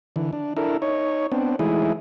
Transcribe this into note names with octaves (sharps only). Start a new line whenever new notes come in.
D3 E3
D4
D4 E4 A4 A#4
D#4 C#5
B3 C4 D4
E3 G#3 A3 D#4 E4 G#4